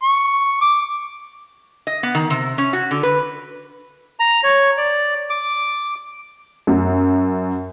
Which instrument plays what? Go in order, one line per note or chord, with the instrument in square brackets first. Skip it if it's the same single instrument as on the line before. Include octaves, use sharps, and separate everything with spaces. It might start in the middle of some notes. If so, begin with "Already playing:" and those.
[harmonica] C#6
D6
[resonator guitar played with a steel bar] D#5
B3
D#3
C3
C#4
F#4
D3
B4
[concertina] A#5
C#5
D5
D6
[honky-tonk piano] F#2